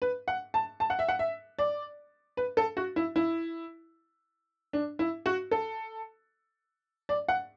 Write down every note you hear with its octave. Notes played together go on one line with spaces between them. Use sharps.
B4
F#5
A5
A5
F#5
E5
F#5
E5
D5
B4
A4
F#4
E4
E4
D4
E4
F#4
A4
D5
F#5